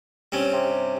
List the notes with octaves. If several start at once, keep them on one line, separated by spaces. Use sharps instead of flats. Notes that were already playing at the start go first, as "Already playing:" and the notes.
G2 C4 C#4
C3